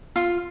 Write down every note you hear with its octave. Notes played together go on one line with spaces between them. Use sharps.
F4